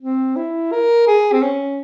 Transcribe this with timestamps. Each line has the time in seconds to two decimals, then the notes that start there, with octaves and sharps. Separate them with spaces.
0.01 C4
0.36 E4
0.72 A#4
1.07 G#4
1.32 C4
1.43 C#4